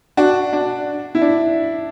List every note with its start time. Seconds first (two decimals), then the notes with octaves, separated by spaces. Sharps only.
0.17 D4 F#4
0.53 D4
1.15 E4
1.22 D4